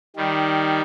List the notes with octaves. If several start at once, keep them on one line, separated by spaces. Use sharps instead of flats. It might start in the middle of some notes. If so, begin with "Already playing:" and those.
D#3 G3